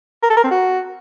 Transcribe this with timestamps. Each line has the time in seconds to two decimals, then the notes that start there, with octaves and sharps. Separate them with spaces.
0.23 A#4
0.30 A4
0.37 A#4
0.44 C4
0.51 F#4